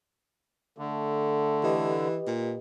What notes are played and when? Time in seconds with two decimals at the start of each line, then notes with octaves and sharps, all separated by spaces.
0.78 D3 A3
1.64 E3 G4 B4 D#5
2.27 A#2